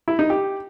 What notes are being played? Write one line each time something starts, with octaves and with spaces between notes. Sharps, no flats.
E4
D#4
G4